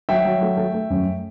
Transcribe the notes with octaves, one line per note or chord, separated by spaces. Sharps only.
F#3 E5 G5
F#3
A3
A3
A3
F#2